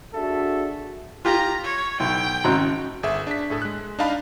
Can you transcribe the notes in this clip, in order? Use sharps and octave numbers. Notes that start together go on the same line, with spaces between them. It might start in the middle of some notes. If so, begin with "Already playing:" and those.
D4 F#4 G#4 A4 E5
F4 G4 A#5
C#5
B1 G5
G#1 G#2 C#4 F#4 A#5 F#6
G1 G#4 E5
D4 B6
A2 G#4 A4
G#3 F#6
D4 D#4 D#5 F5 A5 B5